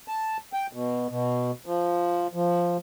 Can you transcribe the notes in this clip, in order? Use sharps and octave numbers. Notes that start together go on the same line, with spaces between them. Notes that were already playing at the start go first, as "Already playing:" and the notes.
A5
G5
B2
B2
F3
F3